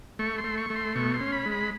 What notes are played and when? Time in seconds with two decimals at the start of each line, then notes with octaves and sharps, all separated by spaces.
0.19 A3 C#6
0.38 C6
0.44 A3
0.57 C#6
0.70 A3
0.76 C6
0.95 B2 C#6
1.14 C6
1.20 C#4
1.32 B5
1.46 G#3
1.52 B5